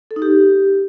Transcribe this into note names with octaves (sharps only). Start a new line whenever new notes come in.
A4
D#4
G4